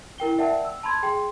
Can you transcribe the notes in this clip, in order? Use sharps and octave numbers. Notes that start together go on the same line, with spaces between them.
E4 A#4 G5 G7
A#4 D5 E5 F#5 G5 A5
E6
A5 B5 C6 G#6
G#4 G5 C6